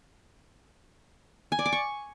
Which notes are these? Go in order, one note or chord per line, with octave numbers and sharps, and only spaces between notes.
G#5
D5
D6
C#6